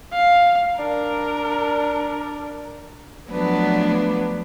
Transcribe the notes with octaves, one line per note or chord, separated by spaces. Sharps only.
F5
D4 A#4
F3 F#3 A3 B3 D4 B4